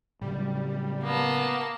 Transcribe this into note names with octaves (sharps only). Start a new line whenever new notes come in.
A2 C#3 F#3 G3
A#3 B3 A5